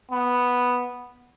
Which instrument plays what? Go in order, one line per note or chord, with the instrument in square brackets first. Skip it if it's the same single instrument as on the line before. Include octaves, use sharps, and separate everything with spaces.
[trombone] B3